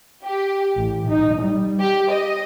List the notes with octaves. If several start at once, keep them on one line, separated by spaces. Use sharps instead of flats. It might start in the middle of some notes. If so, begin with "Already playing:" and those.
G4
A1
D#4
G3
G4
D#5